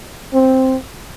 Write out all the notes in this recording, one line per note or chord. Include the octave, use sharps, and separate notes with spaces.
C4